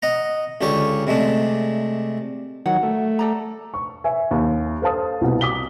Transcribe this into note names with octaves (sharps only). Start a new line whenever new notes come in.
D#5 F#5 A#5
C#2 D3 G4 C#5 C#6
C3 G#3 A3 D4
D#3 F#3 F#5
A3
A4 D5 A#5
C#6
E5 G#5
D#2
A4 C5 F5 A5 D#6
C2 B2
D6 D#6 B6 G7